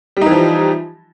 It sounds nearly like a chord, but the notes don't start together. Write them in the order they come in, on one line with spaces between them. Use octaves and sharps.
G3 D#4 E3 F3